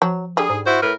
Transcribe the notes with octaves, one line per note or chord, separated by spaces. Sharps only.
F3 F#3
D3 G3 G#4
G#2
E4 F#4 C5
A2 A#4 B4